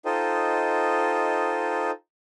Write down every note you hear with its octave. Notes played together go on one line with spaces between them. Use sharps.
D#4 F4 A4 C5 D#5 G5